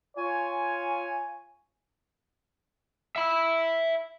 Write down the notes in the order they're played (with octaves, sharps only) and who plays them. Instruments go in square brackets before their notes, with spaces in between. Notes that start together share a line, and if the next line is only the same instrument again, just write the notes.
[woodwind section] F4 G#5 [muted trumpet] C#5
[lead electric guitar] E5 B5